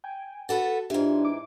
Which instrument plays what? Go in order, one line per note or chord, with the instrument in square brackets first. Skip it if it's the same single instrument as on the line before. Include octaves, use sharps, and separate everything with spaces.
[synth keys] G5 G#5
[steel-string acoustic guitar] F#4 A4 B4 [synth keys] A6
[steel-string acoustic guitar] G#2 E3 [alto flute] D4 [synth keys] F4 G4
[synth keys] D6